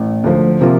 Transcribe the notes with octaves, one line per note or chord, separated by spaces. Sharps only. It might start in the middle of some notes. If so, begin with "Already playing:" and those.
Already playing: A1
D2 D3 F3
C3 F3 A#3 F4